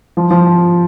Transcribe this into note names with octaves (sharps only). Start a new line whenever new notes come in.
F3
F3